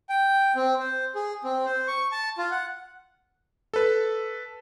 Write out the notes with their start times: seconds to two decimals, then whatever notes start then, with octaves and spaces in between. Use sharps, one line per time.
0.09 G5
0.55 C4
0.80 C5
1.15 G#4
1.44 C4
1.65 C5
1.88 C#6
2.12 A5
2.38 F4
2.51 F#5
3.74 A4 B4